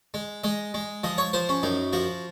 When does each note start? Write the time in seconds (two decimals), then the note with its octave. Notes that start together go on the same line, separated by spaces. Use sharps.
0.14 G#3
0.44 G#3 D#5
0.74 G#3
1.04 F3 D#5
1.18 C#5
1.33 F3 C5
1.49 C#4
1.63 F#2 D#4
1.93 F3 F#4